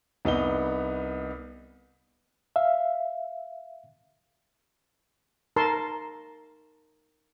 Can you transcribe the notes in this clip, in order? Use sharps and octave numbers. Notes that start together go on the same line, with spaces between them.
C2 B3 D#4 G7
E5 F5
D#4 A#4 A5 C6 C#6